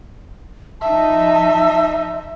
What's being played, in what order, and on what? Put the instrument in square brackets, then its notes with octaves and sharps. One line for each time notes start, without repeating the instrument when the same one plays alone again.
[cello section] F3 D#4 [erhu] E5 [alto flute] A5